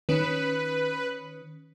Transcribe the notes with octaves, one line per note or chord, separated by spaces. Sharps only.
D#3 C#4 B4